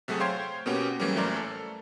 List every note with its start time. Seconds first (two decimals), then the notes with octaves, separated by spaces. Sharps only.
0.08 C3 F#3 A3 F#4 G#4 A4
0.20 C5 C#5 F5 G5 C6 G#6
0.66 B2 A#3 B3 C#4 F#4 G4
1.00 E3 F#3 G3 A3 A#3 C#4
1.16 A1 E3 A3 A#4 C5 D5
1.36 A4